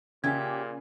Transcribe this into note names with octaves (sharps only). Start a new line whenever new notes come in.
A#2 C#3 G4 E5 G#5 G#6